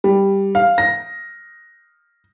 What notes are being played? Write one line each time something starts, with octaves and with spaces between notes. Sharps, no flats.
G3
F5
A#6